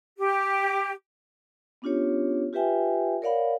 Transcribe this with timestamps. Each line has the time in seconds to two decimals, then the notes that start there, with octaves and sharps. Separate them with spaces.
0.18 G4
1.82 B3 C#4 D4 F4 G4 C#5
2.53 F4 G4 B4 E5 G5 G#5
3.22 A#4 C#5 D5 F5 F#5 B5